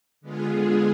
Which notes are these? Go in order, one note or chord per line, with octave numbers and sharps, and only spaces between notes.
D3 G#3 B3 F4 G#4